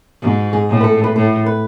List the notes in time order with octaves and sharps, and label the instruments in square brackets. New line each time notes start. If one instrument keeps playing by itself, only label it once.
[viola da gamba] G#2 [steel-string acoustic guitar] F#4
[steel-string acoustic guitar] G#4
[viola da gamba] A2
[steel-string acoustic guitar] B4
A4
B4
[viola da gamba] A2 [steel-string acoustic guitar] A4
[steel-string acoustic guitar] B4